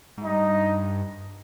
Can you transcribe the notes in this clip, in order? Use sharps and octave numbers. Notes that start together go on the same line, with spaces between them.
G#2
G2 D#4